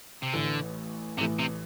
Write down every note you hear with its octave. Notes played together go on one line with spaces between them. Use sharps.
C3
A1 A2 D3 E3
A1 A2 C3 E3
C3